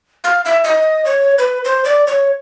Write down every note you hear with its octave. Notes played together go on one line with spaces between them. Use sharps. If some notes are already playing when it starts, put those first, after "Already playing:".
F5
E5
D#5
C#5
B4
C5
D5
C#5